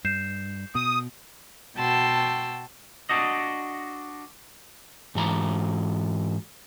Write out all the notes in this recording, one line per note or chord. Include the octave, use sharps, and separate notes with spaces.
G2 G6 C7 E7
B2 D#6
B2 F#4 G5 A5 C6 E6
D4 F#4 D#5
G#2 E3 A#5